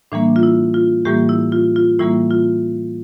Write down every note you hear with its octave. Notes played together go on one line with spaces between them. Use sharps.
A2 E3 G3 A#3 D4
F4
E4
F4
A2 E3 G3 A#3 G4
E4
F4
F4
A2 E3 G3 A#3 E4
F4